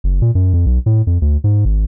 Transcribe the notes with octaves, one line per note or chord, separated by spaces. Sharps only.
F#1
A#2
F#2
F2
B1
A2
F2
D2
G#2
G#1